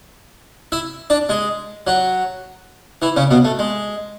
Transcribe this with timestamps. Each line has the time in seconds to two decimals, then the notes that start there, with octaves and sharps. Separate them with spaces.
0.72 E4 E5
1.10 D4 D5
1.29 G#3 G#4
1.87 F#3 F#4
3.02 E3 E4
3.16 C#3 C#4
3.31 B2 B3
3.45 A3
3.59 G#3